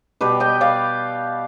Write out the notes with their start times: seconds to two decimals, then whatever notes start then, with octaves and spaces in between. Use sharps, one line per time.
0.21 B2 G3 G4 B4
0.40 D#5 G5
0.61 D5 F5